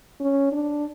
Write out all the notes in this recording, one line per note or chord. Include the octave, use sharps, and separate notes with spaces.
C#4
D4